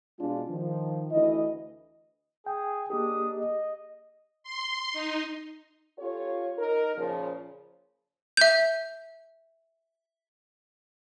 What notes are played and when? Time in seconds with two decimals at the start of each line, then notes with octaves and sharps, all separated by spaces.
0.20 B2 G#3 D4 F4
0.50 D#3 F3
1.11 D2 E3 E4 D#5
2.47 G#4 G5
2.90 A#3 D4 D#4 G4 G#4 D#6
3.35 D#5
4.43 C6
4.93 D#4
5.99 C#4 F4 G4 A4 C#5
6.59 D#4 A#4
6.96 A#2 C#3 F3
8.37 E5 G6